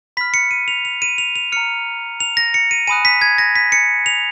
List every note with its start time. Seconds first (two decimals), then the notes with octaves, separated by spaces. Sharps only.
0.17 B5 F6 B6
0.34 C#7
0.51 D#7
0.68 F7
0.85 F7
1.02 D#7
1.18 F7
1.36 F7
1.52 A#5 F6 C#7
2.20 F7
2.37 A#6
2.54 C#7
2.71 D#7
2.87 G#5 B5 D#6 F#6 D#7
3.05 B6
3.21 G#6
3.38 A#6
3.56 B6
3.72 C#7
4.06 F7